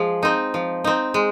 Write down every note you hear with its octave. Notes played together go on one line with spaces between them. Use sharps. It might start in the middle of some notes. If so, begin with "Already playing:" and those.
Already playing: F3 G#3 G#4
C4 D#4
F3
C4 D#4
G#3